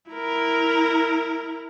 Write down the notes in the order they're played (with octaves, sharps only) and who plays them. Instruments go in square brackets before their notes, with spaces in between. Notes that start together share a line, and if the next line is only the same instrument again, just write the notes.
[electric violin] E4 A#4